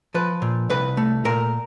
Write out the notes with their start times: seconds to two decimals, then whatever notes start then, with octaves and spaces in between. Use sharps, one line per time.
0.14 F3 B4
0.42 A#2
0.70 C2 B4
0.97 A3
1.25 A#2 A#4